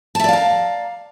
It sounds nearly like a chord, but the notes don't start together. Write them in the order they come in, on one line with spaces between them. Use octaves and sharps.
A5 E5 D5 F5 A#5